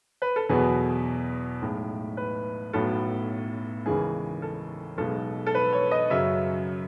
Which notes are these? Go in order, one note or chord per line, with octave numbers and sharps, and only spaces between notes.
B4
A4
E2 B2 F#3 B3 G#4
B1 A2 G#3
B4
B1 A2 F#3 B3 A4
D#2 C#3 E3 G#3 G#4
A4
B1 B2 G#3 A4
A4
B4
C#5
D#5
F#2 C#3 F#3 E5